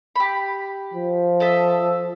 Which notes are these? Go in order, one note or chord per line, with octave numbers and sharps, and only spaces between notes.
G4 B5
F3
A4 D#5 E5